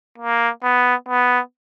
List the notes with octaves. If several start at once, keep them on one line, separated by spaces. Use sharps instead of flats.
A#3
B3
B3